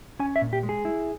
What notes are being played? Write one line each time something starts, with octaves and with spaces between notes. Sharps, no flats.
C#4 G#5
E5
A#2
G4
G#3
G#4
E4